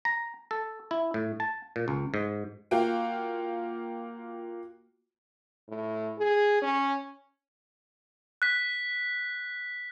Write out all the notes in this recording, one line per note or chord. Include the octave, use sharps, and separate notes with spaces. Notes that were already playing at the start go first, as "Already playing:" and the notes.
A#5
A4
E4
A2
A5
A#2
C#2
G#2
A#3 F4 F#4 G5
A2
G#4
C#4
F#6 B6